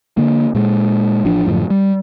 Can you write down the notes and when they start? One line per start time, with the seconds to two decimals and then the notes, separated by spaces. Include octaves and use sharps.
0.17 D3 A#3
0.55 A#2 G#3
1.25 A1 E3 F3 D4
1.48 F#2 A2 D3 F3
1.70 G3